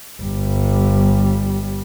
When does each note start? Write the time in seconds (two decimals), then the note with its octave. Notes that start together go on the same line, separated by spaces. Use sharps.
0.22 G1 G3